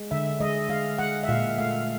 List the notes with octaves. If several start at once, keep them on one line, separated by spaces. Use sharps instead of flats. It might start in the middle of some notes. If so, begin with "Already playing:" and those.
Already playing: G#3
D3 E5
G#3 D#5
G#3 F5
G#3 F#5
E5
A#2 F5
A3 F5